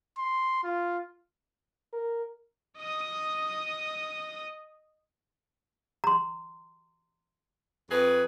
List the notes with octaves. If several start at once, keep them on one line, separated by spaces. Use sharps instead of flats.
C6
F4
A#4
D#5 D#6
A#5 C6
F2 G#4 B4